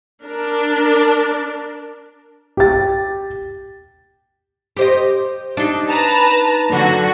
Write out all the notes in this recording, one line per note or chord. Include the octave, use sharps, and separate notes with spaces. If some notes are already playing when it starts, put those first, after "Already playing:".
D4 A#4
G4 A6
G4 C5 D#5
D4 D#4
B4 A5 A#5
D3 F#3 F#4